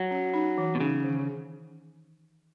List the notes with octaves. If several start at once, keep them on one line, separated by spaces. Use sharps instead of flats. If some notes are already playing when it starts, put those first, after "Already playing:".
Already playing: F#3
C#4
D#4
E3
B2
C#3 D#4
D#3